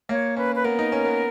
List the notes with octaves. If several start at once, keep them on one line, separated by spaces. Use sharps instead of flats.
A#3 C#5
C#4 B4
B4
B3 A#4
D#4
C#4
B3